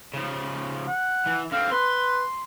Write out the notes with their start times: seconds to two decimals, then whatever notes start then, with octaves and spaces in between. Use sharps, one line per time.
0.14 C#3 F3
0.87 F#5
1.27 E3
1.52 D3 C4 F5
1.72 B4 C6